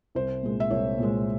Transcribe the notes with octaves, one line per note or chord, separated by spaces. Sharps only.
C2 C5
A#2 G#3
E5
C2 C#5
A#2 G#3